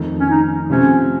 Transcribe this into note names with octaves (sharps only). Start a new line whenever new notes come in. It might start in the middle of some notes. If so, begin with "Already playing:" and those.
Already playing: F2 D#3 A3
C#4
D#4
C3 F3 A3 C4 C#4